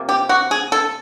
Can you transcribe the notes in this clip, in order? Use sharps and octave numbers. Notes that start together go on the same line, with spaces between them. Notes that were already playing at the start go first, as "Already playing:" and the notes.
Already playing: C3 F3 A#3
G4
F#4
G#4
A4